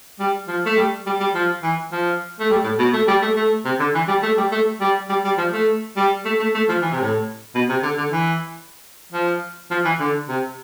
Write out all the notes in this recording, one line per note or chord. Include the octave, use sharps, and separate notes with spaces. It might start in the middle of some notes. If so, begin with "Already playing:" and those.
G3
F3
A3
G3
G3
G3
F3
E3
F3
A3
G3
A2
B2
A3
G3
A3
A3
C3
D3
E3
G3
A3
G3
A3
G3
G3
G3
F3
A3
G3
A3
A3
A3
F3
E3
C3
A2
B2
C3
D3
D3
E3
F3
F3
E3
D3
C3